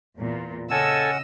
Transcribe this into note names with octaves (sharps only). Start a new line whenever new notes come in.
E2 A#2
C#3 C#4 A4 D#5 F#5 G#5 A5 E6